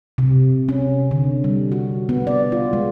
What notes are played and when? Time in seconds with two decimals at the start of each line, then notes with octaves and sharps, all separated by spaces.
0.18 C3
0.69 C#4
1.11 D3
1.44 G3
1.72 F#4
2.09 B3
2.27 D5
2.52 F4
2.73 G#3